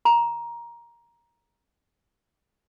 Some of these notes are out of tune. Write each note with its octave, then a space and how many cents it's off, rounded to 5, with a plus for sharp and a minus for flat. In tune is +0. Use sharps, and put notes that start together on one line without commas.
A#5 +15